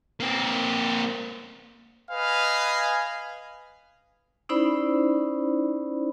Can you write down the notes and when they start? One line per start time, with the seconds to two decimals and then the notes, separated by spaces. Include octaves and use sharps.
0.20 A#3 C4
2.11 B4 D#5 F5 G#5
4.49 C#4 D#4 E4 C5 D5 B5